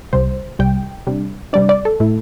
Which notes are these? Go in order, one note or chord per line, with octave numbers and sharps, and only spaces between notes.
C2 C3 G3 C5
C2 C3 G3 G5
C3 G3 D4
C3 G3 D4 D5
D5
A4
A2 A3 E4